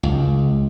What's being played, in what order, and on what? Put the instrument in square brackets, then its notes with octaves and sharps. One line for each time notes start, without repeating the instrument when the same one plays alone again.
[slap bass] C#2